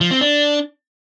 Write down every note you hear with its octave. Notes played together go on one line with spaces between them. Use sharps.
F3
C4
D4